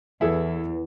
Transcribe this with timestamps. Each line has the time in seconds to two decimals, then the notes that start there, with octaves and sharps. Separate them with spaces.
0.21 E2 E3 E4 G#4 A4